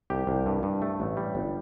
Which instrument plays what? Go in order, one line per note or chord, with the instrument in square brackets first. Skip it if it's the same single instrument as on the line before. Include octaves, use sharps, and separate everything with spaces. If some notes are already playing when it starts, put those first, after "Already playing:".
[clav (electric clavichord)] C2 G4
C2
G2
G2
A3
A1
G3
G1